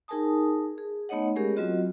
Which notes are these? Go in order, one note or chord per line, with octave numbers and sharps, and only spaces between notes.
D#4 G#4 A#4 G#5 A5 D#6
G#4
A3 B3 D#4 C#5 D#5 F#5
G#3 C#4 G4 G#4 A#4
F#3 C4 F4 F#4 D#5